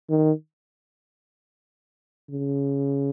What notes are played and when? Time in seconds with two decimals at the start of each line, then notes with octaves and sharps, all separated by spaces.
0.10 D#3
2.30 C#3